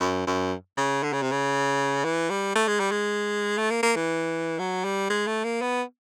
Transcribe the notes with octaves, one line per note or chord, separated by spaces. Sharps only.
F#2
F#2
C#3
D3
C#3
C3
C#3
E3
G3
A3
G#3
G3
G#3
A3
A#3
A#3
E3
F#3
G3
G#3
A3
A#3
B3